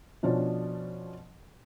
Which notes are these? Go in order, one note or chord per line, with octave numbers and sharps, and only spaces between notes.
B2 F3 C#4 D4